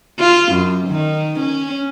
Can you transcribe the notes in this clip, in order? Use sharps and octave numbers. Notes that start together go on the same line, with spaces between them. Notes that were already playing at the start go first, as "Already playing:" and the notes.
F4
F#2
D#3
C#4